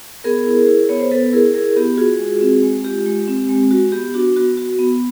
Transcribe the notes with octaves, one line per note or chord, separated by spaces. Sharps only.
B3 G#4 A#4
E4
E4
B3 C#5
C5
B3 A4 B4
E4 G#4 A#4
E4 G#4 A#4
B3 G4
F4 F#4 G#4
G#3
C4
G#3
F4 G4
G#3
C4
G#3
F#4
B3 G4
D4 F#4
B3 F#4
F#4
B3